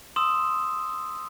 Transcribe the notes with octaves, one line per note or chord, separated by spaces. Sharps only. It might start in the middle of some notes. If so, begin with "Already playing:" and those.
C6 D#6 E6 E7